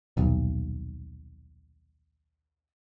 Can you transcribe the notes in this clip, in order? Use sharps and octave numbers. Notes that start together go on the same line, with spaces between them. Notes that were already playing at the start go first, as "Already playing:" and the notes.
D#1 B1